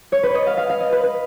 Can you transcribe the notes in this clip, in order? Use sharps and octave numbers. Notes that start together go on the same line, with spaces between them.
C#5
B4
C#5 D#5
F5
F5
F5
D#5
B4
B4